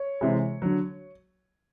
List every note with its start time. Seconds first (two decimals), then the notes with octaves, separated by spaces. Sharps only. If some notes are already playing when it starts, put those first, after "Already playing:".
Already playing: C#5
0.21 C3 E3 G#3
0.62 D3 F#3